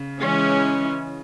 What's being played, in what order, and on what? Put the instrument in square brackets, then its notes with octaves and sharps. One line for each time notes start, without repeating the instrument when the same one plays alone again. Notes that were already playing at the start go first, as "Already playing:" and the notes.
Already playing: [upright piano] C#3
[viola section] E3 G#3 C#4